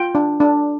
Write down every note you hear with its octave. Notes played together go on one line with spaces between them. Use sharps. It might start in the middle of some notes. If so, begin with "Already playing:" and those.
Already playing: F4 G5
D4
D4